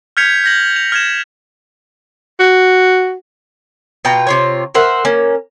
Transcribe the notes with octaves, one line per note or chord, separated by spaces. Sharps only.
F6 G6 G#6 B6 C#7 F7
G6 A#6 F#7
F7
F6 G#6 E7
F#4
B2 F4 G5 A#5
C3 F4 C#5
A#4 C5 E5 F#5
A#3 C#4